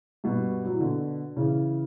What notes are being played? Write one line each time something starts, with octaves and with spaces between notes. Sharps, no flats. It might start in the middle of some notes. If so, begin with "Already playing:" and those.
G2 B2
F#3
E3
B2 D3
C#3 E3